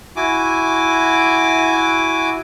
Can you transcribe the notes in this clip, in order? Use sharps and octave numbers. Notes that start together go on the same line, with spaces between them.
E4 F#4 G#5 D6